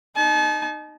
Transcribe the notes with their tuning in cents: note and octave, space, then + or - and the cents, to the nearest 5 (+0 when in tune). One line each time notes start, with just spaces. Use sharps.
D#4 -15 A5 -40